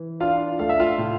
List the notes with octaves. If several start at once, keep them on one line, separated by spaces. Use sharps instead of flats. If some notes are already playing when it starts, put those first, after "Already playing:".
Already playing: E3
D4 F4 F5
A3 F5
E5
F4 F5
A2